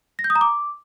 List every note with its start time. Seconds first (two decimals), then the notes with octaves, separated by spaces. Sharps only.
0.19 A#6
0.24 G6
0.30 D#6
0.36 A#5
0.41 D6